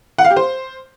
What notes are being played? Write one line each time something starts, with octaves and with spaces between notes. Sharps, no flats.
F#5
F5
G4
C5